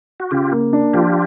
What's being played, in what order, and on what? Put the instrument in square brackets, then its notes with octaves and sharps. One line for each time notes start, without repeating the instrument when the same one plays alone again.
[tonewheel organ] F#4
[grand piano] C#3 [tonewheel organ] F4 G4
[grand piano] A#3
D4
[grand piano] F3 [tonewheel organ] F4 G4